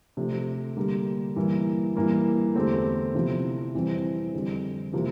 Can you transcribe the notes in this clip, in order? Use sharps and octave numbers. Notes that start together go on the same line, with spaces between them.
C3 F3 A3 D4
D3 G3 A#3
G2 E3 A#3
G2 E3 A#3 E4
E2 D3 A3 C4 G4
C3 F3 C4 E4
F2 E3 G3 C4
F2 D3 G3
C3 F3 A#3 E4